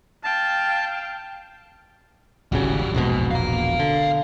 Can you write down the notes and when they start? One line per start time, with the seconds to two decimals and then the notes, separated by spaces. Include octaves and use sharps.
0.24 F5 G5 A5
2.52 D1 G#1 C#3 G3 F#4
2.94 E1 A#1 G#2 B2
3.31 F5 A#5
3.80 D3